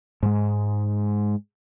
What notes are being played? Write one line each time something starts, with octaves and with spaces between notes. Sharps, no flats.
G#2 G#3